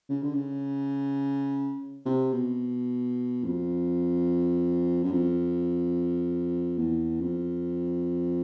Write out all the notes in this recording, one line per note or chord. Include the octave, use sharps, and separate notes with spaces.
C#3
D3
C#3
C3
B2
F2
F#2
F2
E2
F2